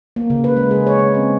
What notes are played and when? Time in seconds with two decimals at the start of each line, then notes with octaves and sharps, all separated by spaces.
0.16 A#3
0.30 C#3
0.44 B4
0.57 G#3
0.71 G#4
0.87 C#5
0.99 G#3
1.14 C4